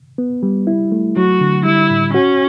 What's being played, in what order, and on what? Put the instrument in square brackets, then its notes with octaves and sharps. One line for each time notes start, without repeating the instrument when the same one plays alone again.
[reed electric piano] B3
G3
E4
A3
[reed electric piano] F#3 [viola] F#4
[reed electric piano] D3
[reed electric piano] G3 [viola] E4
[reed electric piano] A2
[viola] C#4 [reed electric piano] F#4